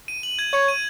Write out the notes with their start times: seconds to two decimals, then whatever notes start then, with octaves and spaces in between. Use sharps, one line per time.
0.08 D#7
0.23 F#7
0.39 G#6
0.53 C#5 G#6
0.68 D#7